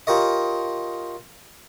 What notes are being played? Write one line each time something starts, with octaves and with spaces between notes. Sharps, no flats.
F4 G4 A#4 C#5 D#5